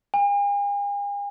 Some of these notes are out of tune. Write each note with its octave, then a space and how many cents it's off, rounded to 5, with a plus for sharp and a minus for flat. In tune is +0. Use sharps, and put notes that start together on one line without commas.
G#5 -45